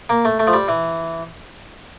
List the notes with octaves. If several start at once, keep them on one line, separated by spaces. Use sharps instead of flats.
A#3
A3
A3
F3
G3
E3